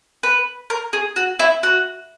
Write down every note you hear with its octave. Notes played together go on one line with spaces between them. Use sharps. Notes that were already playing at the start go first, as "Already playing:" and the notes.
B4
A#4
G#4
F#4
E4
F#4